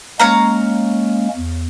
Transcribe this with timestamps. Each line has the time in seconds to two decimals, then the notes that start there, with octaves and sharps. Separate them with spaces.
0.20 G#3 A#3 C#4 C#5 F5 A#5
1.36 E2